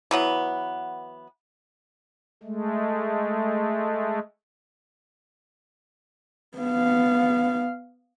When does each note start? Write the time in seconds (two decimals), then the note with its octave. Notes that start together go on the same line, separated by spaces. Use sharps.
0.11 E3 F#3 B3
2.43 G#3 A3
6.58 B3 F5